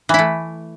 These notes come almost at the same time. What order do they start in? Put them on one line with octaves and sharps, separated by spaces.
E3 E4 A3